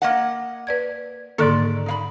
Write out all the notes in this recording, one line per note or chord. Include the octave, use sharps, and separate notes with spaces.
A#3 D#5 F#5
B4 D5 G#6
G#2 D3 D#3 A#3 A4 D5
D#4 F5 B5